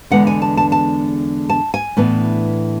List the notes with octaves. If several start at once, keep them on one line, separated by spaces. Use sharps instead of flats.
E2 D3 G#3 B3 F#5
G#5
A5
A5
A5
A5
G#5
A2 E3 B3 D4